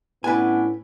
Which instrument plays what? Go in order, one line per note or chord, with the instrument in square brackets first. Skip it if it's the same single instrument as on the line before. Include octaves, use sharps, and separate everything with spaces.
[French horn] A2 [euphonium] B3 [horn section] C#4 D4 E4 [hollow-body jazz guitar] B4 G#5